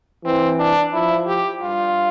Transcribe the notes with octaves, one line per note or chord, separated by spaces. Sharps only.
E3 C4
D4
F3 E4
G4
G2 F4